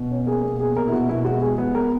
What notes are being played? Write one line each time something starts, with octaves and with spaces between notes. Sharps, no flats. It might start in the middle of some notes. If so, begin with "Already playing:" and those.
Already playing: B2
C#4
A#3 G#4
B2
A#3 G#4
B2 A#4
E4
B2 F#4
B2 E4
G#3 F#4
G#3 G#4
B3
B3 A#4